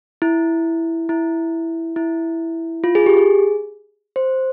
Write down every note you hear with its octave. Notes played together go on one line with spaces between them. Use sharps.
E4
E4
E4
F4
G#4
G4
G#4
C5